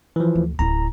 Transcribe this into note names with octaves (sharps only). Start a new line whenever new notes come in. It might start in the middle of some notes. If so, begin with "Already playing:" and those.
E3 F3
D2
D1 E4 A#5